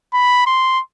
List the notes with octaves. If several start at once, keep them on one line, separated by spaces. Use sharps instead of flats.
B5
C6